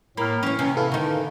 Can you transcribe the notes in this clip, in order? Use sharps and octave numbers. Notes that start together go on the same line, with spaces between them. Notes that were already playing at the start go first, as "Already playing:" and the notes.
A2 A#3 B5 F6
E3 C#4 C#5
C3 B3 C#4
E4 A4 B4 F5
D3 D#3 D#4